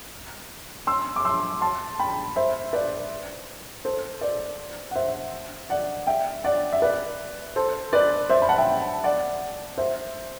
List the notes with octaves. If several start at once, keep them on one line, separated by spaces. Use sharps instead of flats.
C6 E6
D6
C6 E6
A5 C6
G5 B5
C5 E5
B4 D5
A4 C5
B4 D5
F#5
C5 E5
D5 F#5
E5 G5
D5 F#5
E5
B4 D5
A4 C5
B4 D5
C5 E5
B5
F#5 A5
E5 G5
D5 F#5
C5 E5